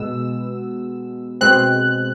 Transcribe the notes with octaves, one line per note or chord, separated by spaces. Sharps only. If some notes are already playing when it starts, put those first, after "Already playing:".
Already playing: B2 G#3 B3 E6
B2 G#3 C4 F#6